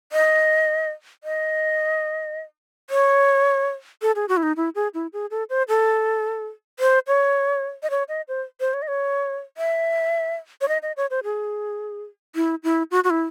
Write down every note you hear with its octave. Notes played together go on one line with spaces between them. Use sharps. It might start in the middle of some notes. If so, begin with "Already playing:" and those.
D#5
D#5
C#5
A4
G#4
F#4
E4
D#4
E4
G#4
E4
G#4
A4
C5
A4
C5
C#5
D#5
C#5
D#5
C5
C5
C#5
D#5
C#5
E5
C#5
D#5
D#5
C#5
C5
G#4
E4
E4
F#4
F#4
E4